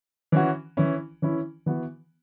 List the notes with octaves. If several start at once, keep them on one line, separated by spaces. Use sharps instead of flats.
E3 C#4 F#4
E3 C#4 E4
E3 C#4 E4
E3 B3 F#4